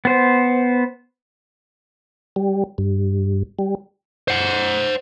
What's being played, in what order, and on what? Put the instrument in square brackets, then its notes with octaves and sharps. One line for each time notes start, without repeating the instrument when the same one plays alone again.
[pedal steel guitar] B3 C5
[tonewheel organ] G3
G2
G3
[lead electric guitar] C5 F#5